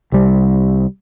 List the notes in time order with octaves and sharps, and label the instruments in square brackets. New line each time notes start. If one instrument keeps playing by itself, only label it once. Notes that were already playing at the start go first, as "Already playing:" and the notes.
[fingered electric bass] C2 G3